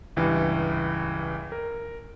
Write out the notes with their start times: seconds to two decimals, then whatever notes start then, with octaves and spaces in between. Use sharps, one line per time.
0.16 C#2 G2 E3
1.52 A#4